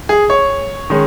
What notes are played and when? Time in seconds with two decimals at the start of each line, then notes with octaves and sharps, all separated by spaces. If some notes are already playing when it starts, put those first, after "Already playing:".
0.09 G#4
0.30 C#5
0.90 D#3 G#3 C#4